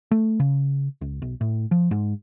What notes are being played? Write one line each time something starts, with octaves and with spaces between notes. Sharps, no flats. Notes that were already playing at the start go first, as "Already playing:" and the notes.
A3
C#3
C#2
B1
A2
F3
G#2